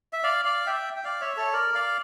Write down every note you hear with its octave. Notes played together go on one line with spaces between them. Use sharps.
E5
D5 F5
D5 F5
E5 G5
G5
D5 F5
C#5 E5
A4 C#5
A#4 D5
D5 F5